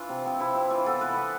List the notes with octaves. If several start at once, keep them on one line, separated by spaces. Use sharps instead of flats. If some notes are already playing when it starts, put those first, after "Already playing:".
Already playing: E3 D4 F4
C3
F3 C4
C3 E4
F3 C4
E3 F4
B3 A4
E3 B4
B3